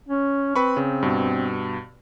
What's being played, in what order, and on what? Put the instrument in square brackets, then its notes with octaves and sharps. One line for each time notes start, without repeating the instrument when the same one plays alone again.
[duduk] C#4
[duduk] C4 [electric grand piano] B4 B5 C#6
[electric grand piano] C#3
G2 B2